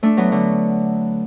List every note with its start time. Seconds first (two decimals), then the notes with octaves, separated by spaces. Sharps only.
0.03 A3 D4
0.17 F#3 B3
0.32 D3 F#3